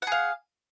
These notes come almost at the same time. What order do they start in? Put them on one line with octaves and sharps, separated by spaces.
F#5 G#4 F5